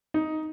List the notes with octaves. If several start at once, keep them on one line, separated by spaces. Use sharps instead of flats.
D#4